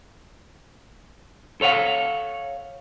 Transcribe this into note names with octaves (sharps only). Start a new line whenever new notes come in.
A4 C#5 F5 F#5